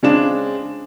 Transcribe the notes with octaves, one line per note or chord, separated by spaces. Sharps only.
C#3 G#3 C4 D4 E7